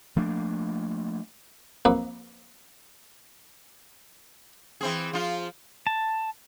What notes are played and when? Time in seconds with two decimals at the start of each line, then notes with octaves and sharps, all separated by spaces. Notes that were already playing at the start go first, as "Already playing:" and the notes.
0.16 F3 A3 A#3 D4
1.85 F2 A#3 B4
4.81 E3 C4 G#4
5.13 F3 F4
5.87 A5